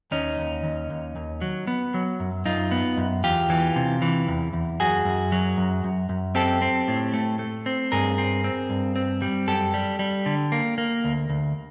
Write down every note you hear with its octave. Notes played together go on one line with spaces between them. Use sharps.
D#2 C#4 D#4
D#2
D#2
D#2
D#2
F#3
B3
F#3
F#2
F#2 D#4 F4
B3
F#2
E2 F4 G4
E3
C3
E3
E2
E2
F#2 F#4 G#4
F#2
F#3
F#2
F#2
F#2
C4 G4 A4
C4
A2
A3
A3
C4
G2 G#4 A#4
C4
C4
G2
C4
G3
F#2 G4 A4
G3
G3
D3
A#3
A#3
D2
D2